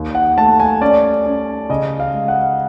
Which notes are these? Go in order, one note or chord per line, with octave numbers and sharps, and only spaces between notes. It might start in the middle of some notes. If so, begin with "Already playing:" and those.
Already playing: D#2
F#5
A3 A5
G#5
C#4 D5
C#4
C#3 D#5
F5
G#3
F#5